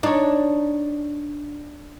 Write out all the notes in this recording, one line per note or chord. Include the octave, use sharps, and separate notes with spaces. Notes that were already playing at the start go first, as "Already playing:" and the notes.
D4 D#4 C#5